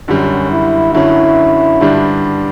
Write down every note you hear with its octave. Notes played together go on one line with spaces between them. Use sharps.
F#2 D3 G3 C#4
E4
F#2 D3 F#3 C#4 E4
G2 D3 G3 D4